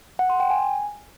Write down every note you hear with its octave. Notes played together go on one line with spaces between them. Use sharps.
F#5
C6
G5
G#5